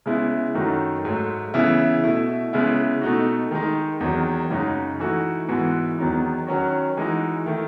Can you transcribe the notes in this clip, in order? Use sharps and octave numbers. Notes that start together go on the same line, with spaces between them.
C#3 G#3 B3 E4
F#2 D#3 A3 D#4 F#4
G#2 F#3 A3
C#3 E3 B3 E4
B2 A3 E4
C#3 G#3 B3 E4
B2 A3 D#4 F#4
D#3 G#3 D#4
E2 D#3 F#3
F#2 C#3 G#3 D#4 F#4
E3 A3 D#4 F#4
G#2 E3 B3 F#4
E2 D#3 F#3 B3 D#4
D#3 F#3 C#4 F#4
E3 G#3 D#4 F#4
D#3 A3 E4